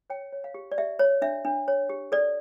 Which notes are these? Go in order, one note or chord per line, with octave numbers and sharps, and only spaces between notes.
C#5 G5
C#5
F5
G4
D5
G4 E5
C#5
D4 E5
D4
C#5
G4
A4 D5